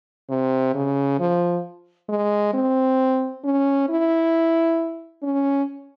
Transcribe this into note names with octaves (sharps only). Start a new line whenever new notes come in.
C3
C#3
F3
G#3
C4
C#4
E4
C#4